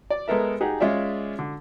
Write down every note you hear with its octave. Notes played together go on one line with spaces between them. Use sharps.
D5
G#3 B3 A4 A#4 E5
D#4 G4 G#4 F#5
G#3 C#4 F4 D5 E5
D3